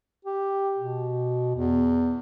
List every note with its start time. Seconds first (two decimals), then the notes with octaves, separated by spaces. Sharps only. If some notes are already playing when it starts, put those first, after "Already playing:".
0.25 G4
0.77 B2
1.55 E2